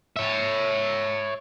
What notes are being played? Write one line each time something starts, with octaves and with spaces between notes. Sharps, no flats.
C#5 E5